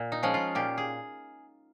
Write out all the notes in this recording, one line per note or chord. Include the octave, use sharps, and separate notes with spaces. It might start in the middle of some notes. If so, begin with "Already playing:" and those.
Already playing: A#2
D#4
F3 G#3 C#4
F4
A#2 G4
G#4